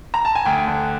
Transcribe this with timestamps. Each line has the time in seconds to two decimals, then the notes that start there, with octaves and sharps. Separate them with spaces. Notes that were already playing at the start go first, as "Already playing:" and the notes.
0.14 A#5
0.25 A5
0.35 G#5
0.45 D2 G5
0.67 D3